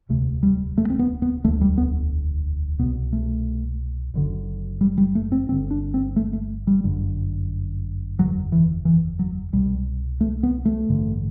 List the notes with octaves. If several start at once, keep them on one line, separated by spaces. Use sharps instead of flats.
E1 D2 C3 A3
G3
A3
C4
B3
B3
E1 D2 D3 A3
G3
B3
C2 B2 B3
A3
F#1 F#2 D3
G3
G3
A3
C4
G1 G2 D3 C4
D4
C4
A3
A3
G3
G1 F#2 D3
F#1 E2 D3 F#3
E3
E3
F#3
C2 B2 G3
A3
B3
A3
A1 G2 D3